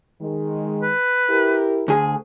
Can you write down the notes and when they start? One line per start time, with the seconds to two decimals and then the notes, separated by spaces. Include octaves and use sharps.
0.21 D#3 G#3
0.82 B4
1.30 E4 G4 A#4
1.88 D2 G#4